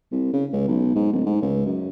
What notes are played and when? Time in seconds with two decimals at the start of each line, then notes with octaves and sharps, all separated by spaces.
0.12 C2
0.33 C#3
0.52 C#2
0.67 B1
0.95 G#2
1.13 D1
1.26 G#2
1.41 C#2
1.65 F#2